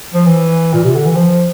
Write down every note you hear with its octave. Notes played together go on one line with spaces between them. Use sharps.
F3
E3
A#2
C3
D3
E3
F3